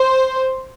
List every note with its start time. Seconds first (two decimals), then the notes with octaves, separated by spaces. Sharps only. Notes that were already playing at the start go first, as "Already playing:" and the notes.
Already playing: C5